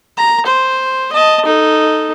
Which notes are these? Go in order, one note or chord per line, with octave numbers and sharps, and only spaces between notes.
A#5
C5
D#5 A5
D#4 A4